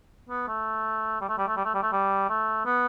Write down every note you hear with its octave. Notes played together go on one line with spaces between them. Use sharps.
B3
A3
G3
A3
G3
A3
G3
A3
G3
A3
G3
A3
B3